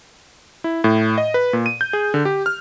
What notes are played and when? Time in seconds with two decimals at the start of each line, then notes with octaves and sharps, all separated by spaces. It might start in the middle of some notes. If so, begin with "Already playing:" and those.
0.64 E4
0.84 A2
1.18 D#5
1.34 B4
1.53 A#2
1.66 D#7
1.81 G6
1.93 G#4
2.14 D3
2.25 G4
2.46 F6